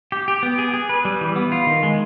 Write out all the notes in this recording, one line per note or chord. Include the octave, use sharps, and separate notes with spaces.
G4
G4
B3
G#4
G#4
B4
G3
E3
B3
F4
D#3
G#3